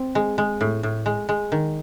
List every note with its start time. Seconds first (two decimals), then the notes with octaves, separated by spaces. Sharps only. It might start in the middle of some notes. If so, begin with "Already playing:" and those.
Already playing: C4
0.15 G#3
0.38 G#3
0.61 A2
0.83 A2
1.06 G#3
1.29 G#3
1.52 D#3